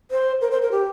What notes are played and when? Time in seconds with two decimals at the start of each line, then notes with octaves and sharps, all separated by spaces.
0.11 C5
0.42 A#4
0.51 C5
0.62 A#4
0.72 G4